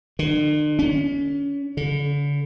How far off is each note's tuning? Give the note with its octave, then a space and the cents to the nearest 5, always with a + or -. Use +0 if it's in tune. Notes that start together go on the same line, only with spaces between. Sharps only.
D3 +45
C#4 +30
D3 -40